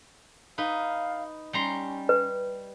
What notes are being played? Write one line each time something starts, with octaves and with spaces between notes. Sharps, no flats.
D#4 B4 F5
G3 C#4 A#5 C6
B4